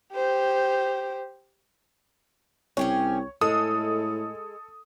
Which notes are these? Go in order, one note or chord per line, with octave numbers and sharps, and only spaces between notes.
G4 C5
C2 C#4 G4 G#4 C#5
A2 G#3 A4 D#6